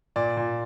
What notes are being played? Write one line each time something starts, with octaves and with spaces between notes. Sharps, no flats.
A#2 D5
A#2